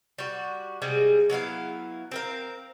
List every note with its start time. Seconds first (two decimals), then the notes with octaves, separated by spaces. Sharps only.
0.19 G3 F#4
0.82 C3 G3 G#3 G#4
1.30 F#3 B3 E4 F5
2.12 C4 A#4 F5